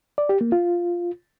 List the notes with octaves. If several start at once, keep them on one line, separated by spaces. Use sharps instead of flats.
D5
G4
A#3
F4